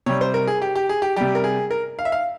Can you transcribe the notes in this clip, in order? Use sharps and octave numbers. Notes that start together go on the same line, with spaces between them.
C3 G3 C#5
C5
A#4
G#4
G4
G4
G#4
G4
C3 G3 G4
A#4
G#4
A#4
F5
E5
F5